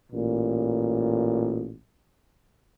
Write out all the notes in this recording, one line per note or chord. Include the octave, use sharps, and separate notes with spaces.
A1 A#2